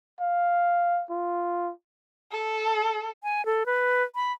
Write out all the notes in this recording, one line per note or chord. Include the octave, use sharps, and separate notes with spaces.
F5
F4
A4
G#5
A4
B4
B5